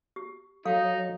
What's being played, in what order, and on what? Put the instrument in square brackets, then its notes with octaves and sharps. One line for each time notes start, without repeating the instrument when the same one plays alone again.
[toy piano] G4
[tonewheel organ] F#3 [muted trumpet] D#4 [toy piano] A4 F5